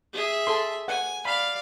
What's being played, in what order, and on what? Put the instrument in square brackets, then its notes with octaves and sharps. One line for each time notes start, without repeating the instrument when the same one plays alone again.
[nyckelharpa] G#4 E5
[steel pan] A4 C6
[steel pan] F#5 [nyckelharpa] G#5
[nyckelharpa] D5 F5 [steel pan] B5